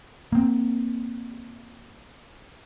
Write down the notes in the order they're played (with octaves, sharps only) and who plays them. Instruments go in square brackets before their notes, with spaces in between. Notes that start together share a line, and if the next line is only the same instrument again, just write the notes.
[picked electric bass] A#3 C4